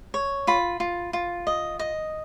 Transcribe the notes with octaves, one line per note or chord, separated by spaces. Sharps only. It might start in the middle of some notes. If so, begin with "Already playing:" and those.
C#5
F4 B5
F4
F4
D#5
D#5